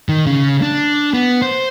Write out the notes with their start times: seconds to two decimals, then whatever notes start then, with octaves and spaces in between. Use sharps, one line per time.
0.09 D#3
0.26 C#3
0.62 D4
1.14 B3
1.42 C5